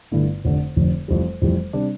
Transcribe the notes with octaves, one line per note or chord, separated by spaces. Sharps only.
G1 G2 D3 A3 E4
F1 F2 D3
F1 F2 D3
F1 F2 E3 G3
F1 F2 E3 G3
C3 G3 D4